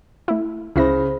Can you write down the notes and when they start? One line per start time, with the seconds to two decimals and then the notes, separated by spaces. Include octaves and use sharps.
0.28 A3 E4
0.76 C#2 C#3 E4 G#4 C5 B5 A#6